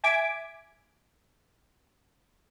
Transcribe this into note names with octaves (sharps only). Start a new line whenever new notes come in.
E5 G#5 D6 G#6 B6 D7